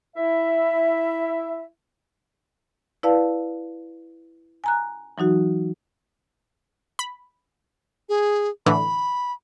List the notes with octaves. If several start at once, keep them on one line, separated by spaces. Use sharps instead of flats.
E4 E5
E4 B4 D5 F5 A5
G#5 A#5 F#6
E3 F#3 D#4 F#4
B5
G#4
A2 D3 E3 B5